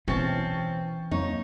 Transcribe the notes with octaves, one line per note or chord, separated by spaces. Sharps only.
B2 E3 C4 C#4 A5
F2 F#3 A#3 D#4 C#5